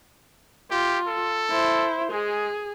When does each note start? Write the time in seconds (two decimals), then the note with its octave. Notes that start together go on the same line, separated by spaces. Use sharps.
0.71 F4 G4
1.07 A4
1.50 E4 C5
2.11 G#3 G#4